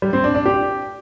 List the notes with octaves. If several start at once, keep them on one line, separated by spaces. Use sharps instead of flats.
G3
C4
D4
D4
G4